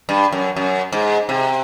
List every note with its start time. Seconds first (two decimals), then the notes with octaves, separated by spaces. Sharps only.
0.09 G2
0.32 F#2
0.56 F#2
0.92 G#2
1.29 C3